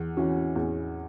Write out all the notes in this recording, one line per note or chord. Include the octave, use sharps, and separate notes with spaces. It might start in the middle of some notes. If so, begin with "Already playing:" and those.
Already playing: E2
E3 C#4 F#4
E2